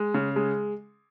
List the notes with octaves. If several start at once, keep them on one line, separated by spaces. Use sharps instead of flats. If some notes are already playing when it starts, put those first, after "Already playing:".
Already playing: G#3
C#3
G#3